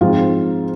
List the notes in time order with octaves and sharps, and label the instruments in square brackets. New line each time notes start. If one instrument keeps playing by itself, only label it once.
[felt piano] G#2 F3 C4 F4 F5